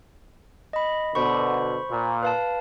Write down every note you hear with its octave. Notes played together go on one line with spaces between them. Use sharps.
D#5 B5
B2 D3 C5 B5 C#6
A#2
B4 F5 A5